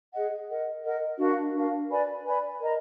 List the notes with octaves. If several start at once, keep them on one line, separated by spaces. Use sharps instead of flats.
G#4 D#5 F#5
A#4 D#5 F#5
A#4 D#5 F#5
D4 F#4 A#4 F5
D4 F#4 A#4 F5
B4 D5 G#5 B5
B4 D5 G#5 B5
A#4 D#5 A#5